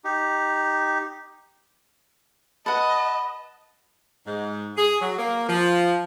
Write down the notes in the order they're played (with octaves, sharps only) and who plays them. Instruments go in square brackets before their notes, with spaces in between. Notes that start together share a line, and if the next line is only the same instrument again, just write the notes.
[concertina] D#4 G4
[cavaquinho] B4 F#5 [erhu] D#5 [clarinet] A5
[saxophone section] G#2
G#4
F#3
A#3
F3